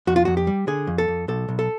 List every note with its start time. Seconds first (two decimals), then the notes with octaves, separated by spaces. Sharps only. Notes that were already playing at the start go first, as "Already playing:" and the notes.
0.07 F2 F#4
0.16 F4
0.25 F2 F#4
0.37 G4
0.47 G3
0.67 D3 G#4
0.87 F2
0.98 A4
1.08 F2
1.28 B1 A4
1.49 B1
1.59 A4